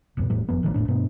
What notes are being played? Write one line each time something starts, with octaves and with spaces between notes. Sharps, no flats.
D#1 C2 G2 B2
E1 A2 G3
F#1 F2 B3
A1 D#3 F3 G3
E1 B1 A2 D4
G2 B2 B3 D4